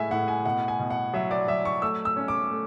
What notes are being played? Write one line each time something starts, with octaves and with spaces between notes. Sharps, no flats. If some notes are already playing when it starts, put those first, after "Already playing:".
Already playing: A2 G#3 E5 G#5
A2 F#5
G#5
B2 F#5
G#5
B2
F#5
F#3 E5
D5
F#3 E5
C#6
A3 E6
E6
C#4
D6
A3